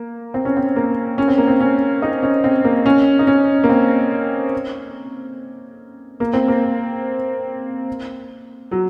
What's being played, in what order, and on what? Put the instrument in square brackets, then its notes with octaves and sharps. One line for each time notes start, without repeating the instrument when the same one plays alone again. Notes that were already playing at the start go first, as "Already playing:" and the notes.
Already playing: [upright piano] A#3
C4
C#4
C4
A#3
C#4
C4
A#3
C4
C#4
D#4
C#4
C4
A#3
C#4
D#4
C#4
A#3
C4
A#3
C4
A#3
F#3